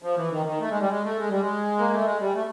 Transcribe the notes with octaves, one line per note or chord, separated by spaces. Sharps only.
F3
E3
D#3
D#3
A3
G#3
G3
G#3
A3
G#3
G3
G#3
A#3
A3
G#3
G3
A3